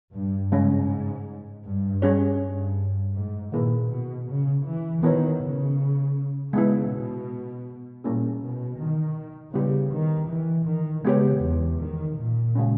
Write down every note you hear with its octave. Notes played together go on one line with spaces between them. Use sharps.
G2
G#2 C#3 G#3 C#4
G2
G3 C#4 G#4 C#5
G2
G#2
A#2 D#3 A#3 E4 G#4 B4
B2
C#3
E3
D#3 B3 E4 A#4 C#5
C#3
C#3 G#3 B3 E4
B2
A#2 G3 A#3 C#4 E4 G#4
B2
D#3
C#3 G3 B3 E4 G4
D#3
E3
D#3
C#3 G#3 B3 G4 C#5
E2
D#3
A#2
C#3 G#3 C#4